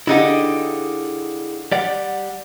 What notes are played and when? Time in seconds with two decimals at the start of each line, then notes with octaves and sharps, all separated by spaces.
0.07 D3 D#4 E4 G4 G#4 F5
1.72 G3 D5 F#5